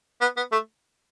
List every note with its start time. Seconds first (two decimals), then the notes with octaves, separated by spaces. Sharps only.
0.21 B3
0.37 B3
0.52 A3